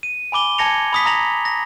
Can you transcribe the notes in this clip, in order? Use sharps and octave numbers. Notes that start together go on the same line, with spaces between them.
D#7
G#5 B5 D6 G7
G#5 A5 G#6 A#6 C#7 F7
B5 D#6 B6
A#5 D#6 A#6 F7 F#7
A#6